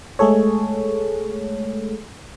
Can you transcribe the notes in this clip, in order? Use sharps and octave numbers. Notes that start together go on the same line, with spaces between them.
G#3 A3 G#4 A4 C#5